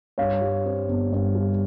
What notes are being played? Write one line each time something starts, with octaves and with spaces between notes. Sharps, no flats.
G2 C#5 F5
G3
C4
G1
G2
G3